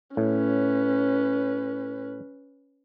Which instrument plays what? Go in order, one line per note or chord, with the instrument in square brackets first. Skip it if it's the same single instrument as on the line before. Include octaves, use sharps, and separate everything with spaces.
[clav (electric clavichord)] A2 [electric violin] C#4 B4